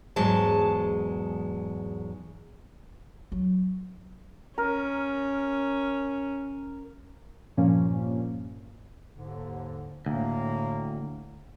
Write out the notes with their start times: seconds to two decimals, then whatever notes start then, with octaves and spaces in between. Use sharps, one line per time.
0.16 E2 G#2 F#3 G#3 A5
3.32 F#3
4.58 C#4 A#4
7.57 G2 A#2 F3 A#3 C#4
9.16 D#2 G#2 D3
10.06 D2 A2 A#3